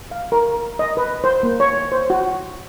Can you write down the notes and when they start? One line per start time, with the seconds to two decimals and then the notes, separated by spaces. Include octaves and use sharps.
0.11 F5
0.32 A#4
0.79 D#5
0.97 B4
1.24 C5
1.43 A#3
1.60 C#5
1.92 C5
2.10 F#4